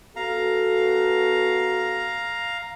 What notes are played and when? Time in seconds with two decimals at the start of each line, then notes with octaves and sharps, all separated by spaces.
0.16 B3 F#4 A4 F5 A#5